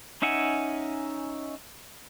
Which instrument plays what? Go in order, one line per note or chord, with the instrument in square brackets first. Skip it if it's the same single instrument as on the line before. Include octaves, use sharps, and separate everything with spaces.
[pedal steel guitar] C#4 D#4 E5 F#5 G#5